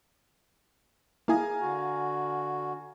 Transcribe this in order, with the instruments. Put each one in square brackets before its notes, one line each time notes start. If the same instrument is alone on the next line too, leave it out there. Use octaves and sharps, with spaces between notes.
[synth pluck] A#3 E4 G#4 [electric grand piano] F5 G#5 A#5
[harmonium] D3 F#4